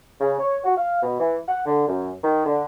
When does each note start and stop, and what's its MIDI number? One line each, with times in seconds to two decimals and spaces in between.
0.21 0.36 49
0.40 0.59 73
0.64 0.73 66
0.77 1.02 77
1.03 1.17 47
1.19 1.37 52
1.48 1.61 78
1.66 1.84 50
1.88 2.11 42
2.23 2.46 51
2.46 2.65 50